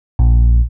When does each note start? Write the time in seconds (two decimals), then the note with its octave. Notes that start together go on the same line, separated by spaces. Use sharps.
0.19 A#1